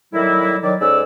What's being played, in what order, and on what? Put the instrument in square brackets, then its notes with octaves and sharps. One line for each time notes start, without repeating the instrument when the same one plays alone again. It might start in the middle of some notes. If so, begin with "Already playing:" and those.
[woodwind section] A2 D#3 F#3 G3 A#3 E4
D#3 F#3 D5
G#2 C#4 A4 D5 E6